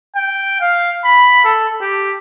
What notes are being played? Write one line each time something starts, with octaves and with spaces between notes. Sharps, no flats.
G5
F5
B5
A4
G4